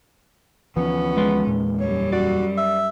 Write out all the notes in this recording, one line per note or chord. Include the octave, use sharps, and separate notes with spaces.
D2 E3 F3 B3 C#4
G#3 B4 C6
E2 A#2
F#2 G3 C#5
F#4 D5
E5